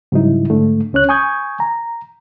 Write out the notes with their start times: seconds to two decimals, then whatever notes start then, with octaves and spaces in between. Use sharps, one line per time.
0.12 G#2 C#3 F#3 G3 D#4 E4
0.50 G#2 D3 A3
0.93 C#2 C#4 C#5 F#6
1.09 G#5 C#6 D#6 G6 G#6
1.60 A#5